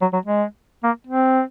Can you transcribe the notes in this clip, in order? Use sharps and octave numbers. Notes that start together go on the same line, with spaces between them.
F#3
F#3
G#3
A#3
C4